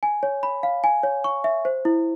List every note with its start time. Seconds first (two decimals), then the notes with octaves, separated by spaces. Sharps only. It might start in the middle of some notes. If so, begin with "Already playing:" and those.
0.03 G#5
0.23 C#5
0.43 B5
0.63 F5
0.84 G#5
1.03 C#5
1.24 C#6
1.44 E5
1.65 C5
1.85 E4